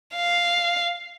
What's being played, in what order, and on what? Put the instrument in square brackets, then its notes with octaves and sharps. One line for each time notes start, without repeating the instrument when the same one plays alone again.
[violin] F5